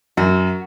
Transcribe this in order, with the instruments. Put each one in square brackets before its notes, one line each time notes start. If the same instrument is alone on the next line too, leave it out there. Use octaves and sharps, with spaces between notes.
[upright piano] F#2 [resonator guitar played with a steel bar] F#4